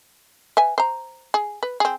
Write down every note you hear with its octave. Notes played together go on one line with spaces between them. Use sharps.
B4 E5 G#5
C5 A#5
G#4
B4
C4 G#4